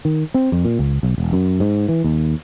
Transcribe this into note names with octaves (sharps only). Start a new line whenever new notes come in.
D#3
C4
F2
A#2
C#2
B1
E1
F#2
G#2
E3
D#2